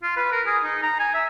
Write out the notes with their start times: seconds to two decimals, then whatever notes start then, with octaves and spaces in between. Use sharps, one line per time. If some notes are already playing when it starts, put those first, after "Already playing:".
0.03 F4
0.17 B4
0.32 A#4
0.47 G#4
0.64 D#4
0.83 A#5
0.99 G#5
1.14 E5